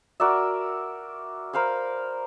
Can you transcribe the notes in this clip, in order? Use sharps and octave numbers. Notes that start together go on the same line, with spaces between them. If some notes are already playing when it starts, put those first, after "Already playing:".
F#4 A#4 D5 E5
A#4 C5 F5 B5